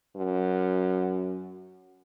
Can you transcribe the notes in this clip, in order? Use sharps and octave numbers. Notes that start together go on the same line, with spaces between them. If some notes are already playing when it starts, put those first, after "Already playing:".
F#2